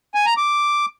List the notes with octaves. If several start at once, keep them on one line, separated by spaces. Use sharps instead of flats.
G#5
A#5
D6